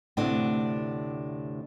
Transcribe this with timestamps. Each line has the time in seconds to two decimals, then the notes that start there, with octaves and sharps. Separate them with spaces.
0.17 D2 A2 C3 A3 D4 F#5